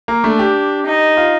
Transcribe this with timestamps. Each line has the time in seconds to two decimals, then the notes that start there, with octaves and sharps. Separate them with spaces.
0.08 A#3
0.24 A3 D4
0.39 G4
0.86 D#4
1.17 F4